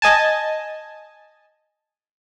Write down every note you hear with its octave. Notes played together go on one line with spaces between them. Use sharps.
D#5 G#5 A5